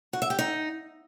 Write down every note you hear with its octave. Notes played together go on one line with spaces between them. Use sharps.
F#4
E5
G4
D#4